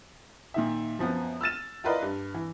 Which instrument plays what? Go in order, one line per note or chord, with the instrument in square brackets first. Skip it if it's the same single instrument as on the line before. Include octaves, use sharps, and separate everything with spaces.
[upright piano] A#2 D#3 E5
F#2 F3 B3
E6 F6 A6 E7
E4 F4 A#4 B4 D5 D#5
G2
E3